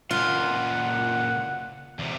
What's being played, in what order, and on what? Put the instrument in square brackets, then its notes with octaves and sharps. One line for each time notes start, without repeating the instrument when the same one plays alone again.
[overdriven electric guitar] C#2 A#2 [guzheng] F4 [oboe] F#5
[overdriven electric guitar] E2 C3